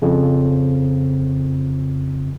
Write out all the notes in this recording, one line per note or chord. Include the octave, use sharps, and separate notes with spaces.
F2 C#3